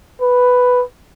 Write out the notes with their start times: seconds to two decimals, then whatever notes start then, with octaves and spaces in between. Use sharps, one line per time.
0.21 B4